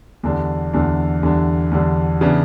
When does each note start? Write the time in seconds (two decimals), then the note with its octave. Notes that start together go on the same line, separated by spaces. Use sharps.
0.23 E2 D3 G3 D4
0.73 E2 D3 G3 D4
1.23 E2 D3 G3 D4
1.71 E2 D3 G3 D4
2.21 C#3 E3 B3 D4